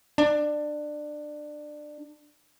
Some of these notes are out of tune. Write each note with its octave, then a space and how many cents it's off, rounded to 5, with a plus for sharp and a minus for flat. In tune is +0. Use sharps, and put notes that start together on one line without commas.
D4 +20